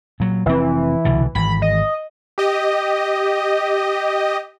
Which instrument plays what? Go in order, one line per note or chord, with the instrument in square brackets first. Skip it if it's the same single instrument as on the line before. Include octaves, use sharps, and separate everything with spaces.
[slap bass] A#2 F#3
[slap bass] F1 C4 [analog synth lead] E3
[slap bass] C2 B2 D3
[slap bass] G#1 E3 [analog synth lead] B5
[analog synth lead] D#5
[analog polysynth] G4 D#5